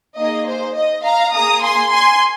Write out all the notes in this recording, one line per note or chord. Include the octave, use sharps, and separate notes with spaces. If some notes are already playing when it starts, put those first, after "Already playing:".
A#3 D#4 G#4 D#5
C5
D#5
F5 A#5
A#3 G#4 A#5 D#6
G#5 C6
G#5 C6